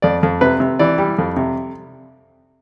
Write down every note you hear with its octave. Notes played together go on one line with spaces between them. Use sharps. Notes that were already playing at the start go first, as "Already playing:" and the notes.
F2 D5
F2
C3 B4
C3
E3 D5
G3
F2
C3